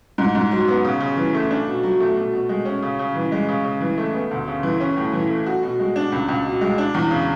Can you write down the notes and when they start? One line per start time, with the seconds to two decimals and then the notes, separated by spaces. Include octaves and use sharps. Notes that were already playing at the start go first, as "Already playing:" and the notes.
0.18 G#2
0.35 G#2
0.51 F#3
0.68 B3
0.85 C#3
1.00 C#3
1.17 E3
1.34 A3
1.51 D4
1.67 B2
1.83 F#3
2.00 A3
2.16 B2
2.33 B2
2.49 G#3
2.65 C#4
2.83 C#3
2.99 C#3
3.15 E3
3.32 G#3
3.49 C#3
3.65 C#3
3.81 E3
3.98 A3
4.14 B3
4.31 D2
4.48 C#3
4.63 E3
4.80 C#4
4.97 A2
5.13 E3
5.30 A3
5.46 F#4
5.63 B2
5.80 G#3
5.96 D4
6.12 C#2
6.28 C#2
6.46 B2
6.61 G#3
6.78 D4
6.94 E2
7.11 C#3